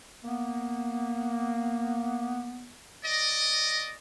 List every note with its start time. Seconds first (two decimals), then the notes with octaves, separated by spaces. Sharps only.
0.24 A#3 B3
3.05 D5 D#5